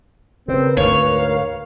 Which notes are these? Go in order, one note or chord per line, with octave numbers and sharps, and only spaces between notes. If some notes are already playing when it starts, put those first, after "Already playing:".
C#3 C4 A#4 B4
D2 G#2 C#5 F5